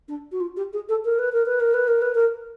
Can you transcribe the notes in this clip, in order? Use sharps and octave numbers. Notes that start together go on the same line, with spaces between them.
D4
F#4
F4
G4
G#4
A4
A#4
B4
A#4
B4
A#4
B4
A#4
B4
A#4